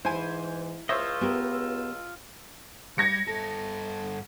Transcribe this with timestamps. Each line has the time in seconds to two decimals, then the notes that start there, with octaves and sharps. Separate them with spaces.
0.05 G#2 E3 E4 C5 G#5
0.89 C#2 F4 C5 C#5 D#5 E5 E6
1.21 B3 G4 A#4
2.98 G3 G#6 A#6 C#7
3.27 G2 A4